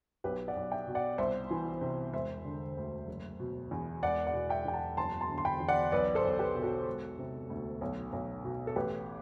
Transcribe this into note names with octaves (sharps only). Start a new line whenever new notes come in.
B1 G4 B4
D5 F#5
B1
E5 G5
B2
D5 F#5
C2 C5 E5
E3
C3
E1 C5 E5
D3
D2
F#1
B2
E2
E1 D5 F#5
D5 F#5
B2
E5 G5
E2 G5
F#5 A5
F#1 A5 C6
A5 C6
D3
C6
G5 B5
E2
D5 F#5
B1 B4 D5
A4 C5
B1
G4 B4
B2
F#4 A4
E1
C3
D2
B1
B1
B2
A4
A1 G4 B4